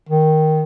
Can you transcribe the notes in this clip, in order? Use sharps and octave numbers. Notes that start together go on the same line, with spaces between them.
D#3